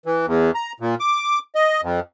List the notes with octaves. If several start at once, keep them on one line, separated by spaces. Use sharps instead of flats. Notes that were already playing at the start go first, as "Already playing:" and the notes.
E3
E2
A#5
A#2
D6
D#5
F2